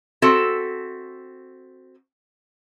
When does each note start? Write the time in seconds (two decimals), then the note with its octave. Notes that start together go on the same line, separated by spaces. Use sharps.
0.22 C4 F#4 A4 E5